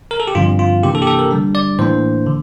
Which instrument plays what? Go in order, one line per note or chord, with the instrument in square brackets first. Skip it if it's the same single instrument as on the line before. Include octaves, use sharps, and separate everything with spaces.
[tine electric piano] A#4
A4
G4
G2 D3 F3 C4 F4
F4
C3 E3 A#3 D4 G4
A4
G4
A4
A#4
D3 G3 D4
D5
A2 E3 A#3 D4 C5
D3